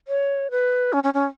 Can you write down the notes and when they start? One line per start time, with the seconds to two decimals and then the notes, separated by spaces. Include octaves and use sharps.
0.08 C#5
0.51 B4
0.93 C#4
1.04 C#4
1.14 C#4